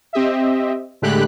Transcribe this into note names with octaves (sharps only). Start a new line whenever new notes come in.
C4 G4 D#5 E5
A2 D3 G#3 G4 B5 F#6